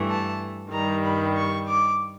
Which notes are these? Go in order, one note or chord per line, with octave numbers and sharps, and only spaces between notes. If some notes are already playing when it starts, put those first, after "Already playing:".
Already playing: G2 E3 A3
A5
G2 D#3 G3 A#5
B5
C#6
D6